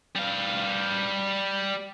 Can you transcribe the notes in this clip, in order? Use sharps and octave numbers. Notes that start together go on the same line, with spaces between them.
G3 F5